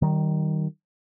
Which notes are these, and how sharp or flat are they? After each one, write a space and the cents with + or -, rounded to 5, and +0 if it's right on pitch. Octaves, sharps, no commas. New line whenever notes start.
D#3 +0 G3 -35